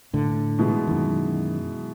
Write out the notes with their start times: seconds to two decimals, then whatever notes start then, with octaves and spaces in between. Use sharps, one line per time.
0.13 A2 D3
0.59 B2 E3 G#3
0.87 F#2 D#3